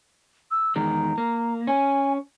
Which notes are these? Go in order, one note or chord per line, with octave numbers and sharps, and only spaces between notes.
E6
E2 D#3 G#3 A#5
A#3
C#4 G#5